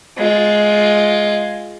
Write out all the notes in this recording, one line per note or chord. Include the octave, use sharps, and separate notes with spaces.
G#3 F4